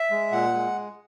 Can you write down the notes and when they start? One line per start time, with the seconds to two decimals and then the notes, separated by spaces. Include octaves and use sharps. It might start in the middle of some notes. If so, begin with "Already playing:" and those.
Already playing: E5
0.10 G#3
0.32 A#2 F#5
0.53 G#3